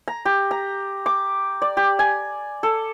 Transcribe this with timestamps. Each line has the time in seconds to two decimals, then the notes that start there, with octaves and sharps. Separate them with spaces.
0.08 A#5
0.25 G4
0.51 A#5
1.06 D6
1.62 D5
1.77 G4
1.99 G#5
2.63 A4